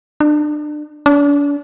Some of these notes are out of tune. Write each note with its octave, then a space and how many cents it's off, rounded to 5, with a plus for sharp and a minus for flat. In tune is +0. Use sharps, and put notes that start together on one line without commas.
D4 +30
D4 -40